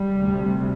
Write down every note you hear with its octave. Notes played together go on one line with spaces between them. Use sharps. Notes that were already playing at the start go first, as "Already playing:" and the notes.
Already playing: G3
D2 C3